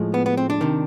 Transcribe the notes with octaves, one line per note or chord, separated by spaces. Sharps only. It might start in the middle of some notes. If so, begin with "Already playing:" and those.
Already playing: A2 F3 G#3
B3
B3
C4
D4
C3 D#3